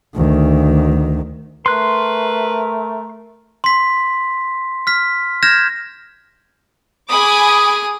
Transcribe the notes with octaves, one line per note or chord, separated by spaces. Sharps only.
D2 D#3
A3 A#4 B4 C6 F#6
C6 B6
F6 B6
F6 G6 G#6 A#6 E7
G#4 G#5 B5 D6 D#6